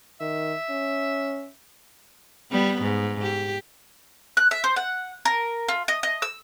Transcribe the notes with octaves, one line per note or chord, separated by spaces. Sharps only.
D#3 E5
C#4
G3 B3
G#2
G4
F#6
E5
C5
F#5
A#4
F4
D#5
D#5
E6